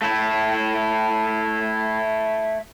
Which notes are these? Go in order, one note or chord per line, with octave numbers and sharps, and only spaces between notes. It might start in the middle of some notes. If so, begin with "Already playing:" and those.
A3 E4